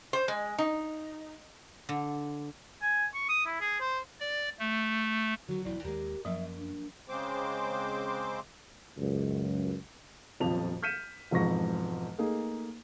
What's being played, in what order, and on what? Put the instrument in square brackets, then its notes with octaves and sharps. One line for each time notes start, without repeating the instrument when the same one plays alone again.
[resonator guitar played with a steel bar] C5
G#3
D#4
[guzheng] D3
[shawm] G#5
C#6
D#6
E4
G#4
C5
[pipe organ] D5
A3
[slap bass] D3 D#3 [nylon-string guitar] F#3 [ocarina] F#4
[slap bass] E1 B1 B2 [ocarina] E4 [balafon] D5
[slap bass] D#2 G#3 [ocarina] G4 [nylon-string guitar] A#4
[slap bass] F#2 [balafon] F3 F#3 [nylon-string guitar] A#3 [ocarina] E5
[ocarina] D4
[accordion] C#3 G#3 C4 C5 D6
[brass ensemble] C#2 F#2
[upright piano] D#1 B1 F2 F3 A5 F7
F6 G6 B6 C#7 D#7 E7
E1 F2 G#2 F3 C#6 A#6
A3 A#3 D#4 G#4